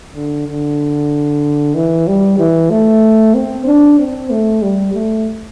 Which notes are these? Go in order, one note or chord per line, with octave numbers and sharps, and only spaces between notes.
D3
D3
E3
G3
E3
A3
C4
D4
C4
A3
G3
A3